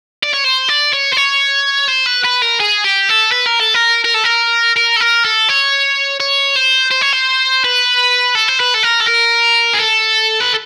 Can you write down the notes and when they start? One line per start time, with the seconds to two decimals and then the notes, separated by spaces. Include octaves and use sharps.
0.23 D5
0.34 C#5
0.44 C5
0.69 D5
0.93 C#5
1.12 C5
1.16 C#5
1.88 C5
2.06 B4
2.24 B4
2.42 A#4
2.60 G#4
2.84 G4
3.09 A4
3.32 B4
3.47 A#4
3.60 A4
3.74 A#4
4.05 A#4
4.15 A4
4.25 A#4
4.76 A#4
4.96 A4
5.00 A#4
5.25 A4
5.49 C#5
6.20 C#5
6.56 C5
6.91 C5
7.02 C#5
7.13 C5
7.64 B4
8.35 A4
8.49 C5
8.60 B4
8.75 A4
8.83 A#4
9.00 A4
9.07 A#4
9.73 G#4
9.80 A4
10.40 B4